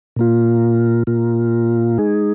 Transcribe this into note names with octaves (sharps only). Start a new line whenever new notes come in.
A#2 A#3 F4
A#2 A#3 F4
G#3 D#4 G#4